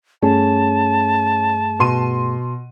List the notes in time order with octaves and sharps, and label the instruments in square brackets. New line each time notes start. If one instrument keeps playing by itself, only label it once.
[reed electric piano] G2 A3 G#4 [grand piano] C#4 [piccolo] A5
[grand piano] B2 C6 D#7